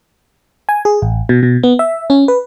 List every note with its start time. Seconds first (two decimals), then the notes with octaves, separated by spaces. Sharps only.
0.69 G#5
0.85 G#4
1.02 A1
1.29 B2
1.43 B2
1.63 B3
1.79 E5
2.10 C#4
2.28 B4